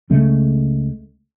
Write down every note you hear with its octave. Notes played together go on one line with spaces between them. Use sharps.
C#2 C#3 G#3 A3